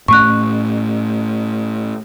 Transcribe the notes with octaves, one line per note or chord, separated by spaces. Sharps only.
A2 A3 C#4 C#6 F#6